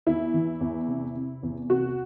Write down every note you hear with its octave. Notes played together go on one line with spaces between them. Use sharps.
E2 E4
E3
E2
C3
C3
E2
C2 F#4